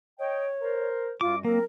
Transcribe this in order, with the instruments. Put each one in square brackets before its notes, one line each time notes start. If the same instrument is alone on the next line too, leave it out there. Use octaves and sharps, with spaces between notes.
[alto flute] C#5 [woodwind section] D#5 G5
[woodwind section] A#4 C5
[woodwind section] F#2 G3 F#4 [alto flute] F4 [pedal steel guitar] D6
[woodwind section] F#3 C4 [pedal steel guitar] A#3 [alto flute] A#4